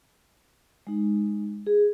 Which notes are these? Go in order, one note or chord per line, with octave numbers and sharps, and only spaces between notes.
G#3 D#4
G#4